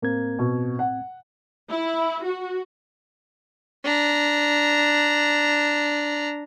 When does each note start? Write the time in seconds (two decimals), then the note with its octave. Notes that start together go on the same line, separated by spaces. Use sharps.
0.02 A2 A#3 C4 G#6
0.39 B2
0.79 F#5
1.71 E4
2.23 F#4
3.84 D4 A#5